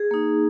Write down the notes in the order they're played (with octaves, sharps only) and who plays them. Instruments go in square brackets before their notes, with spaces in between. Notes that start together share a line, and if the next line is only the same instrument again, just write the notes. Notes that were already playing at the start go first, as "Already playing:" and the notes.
Already playing: [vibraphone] G#4
A#3 D#4